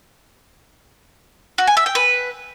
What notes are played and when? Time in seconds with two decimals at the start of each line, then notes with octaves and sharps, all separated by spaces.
1.58 F#4
1.67 G#5
1.77 E5
1.86 G5
1.95 B4